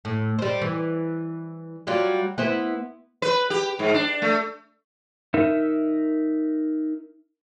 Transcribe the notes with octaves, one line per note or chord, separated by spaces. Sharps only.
A2
G3 C5
E3
F#3 G3 F4
B3 E4 C5
B4
G4
G#2
D4
A3
D#4 A#4 E5